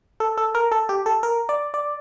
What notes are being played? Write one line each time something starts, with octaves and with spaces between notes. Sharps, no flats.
A4
A4
A#4
A4
G4
A4
A#4
D5
D5